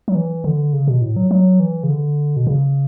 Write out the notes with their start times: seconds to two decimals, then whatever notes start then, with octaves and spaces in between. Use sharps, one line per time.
0.08 F#3
0.15 E3
0.44 D3
0.73 C#3
0.87 B2
1.02 A2
1.16 F#3
1.31 F#3
1.60 E3
1.83 C#3
1.90 D3
2.37 B2
2.47 C#3